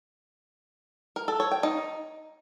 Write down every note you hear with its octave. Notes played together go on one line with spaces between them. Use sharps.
A#4
A4
C#5
G5
D#4